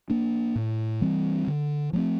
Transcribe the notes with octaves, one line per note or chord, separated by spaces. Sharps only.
A#3 D4
A2
E3 G3 C4
D3
F3 A3 C4